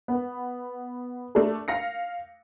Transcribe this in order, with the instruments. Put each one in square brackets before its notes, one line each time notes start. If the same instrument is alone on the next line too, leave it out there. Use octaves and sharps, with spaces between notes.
[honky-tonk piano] B3
A3 D4 A4
F5 A#6 C#7